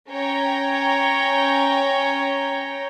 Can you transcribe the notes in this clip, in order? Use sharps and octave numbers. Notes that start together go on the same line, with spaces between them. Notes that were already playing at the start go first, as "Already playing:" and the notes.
C#4 C#5 G5 A#5